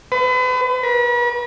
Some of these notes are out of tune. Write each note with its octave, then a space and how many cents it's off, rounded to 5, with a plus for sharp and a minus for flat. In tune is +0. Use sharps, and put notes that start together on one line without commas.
B4 +40
B4 -40